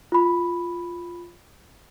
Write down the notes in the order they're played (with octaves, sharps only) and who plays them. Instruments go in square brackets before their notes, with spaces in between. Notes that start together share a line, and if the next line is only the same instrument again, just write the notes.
[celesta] F4 B5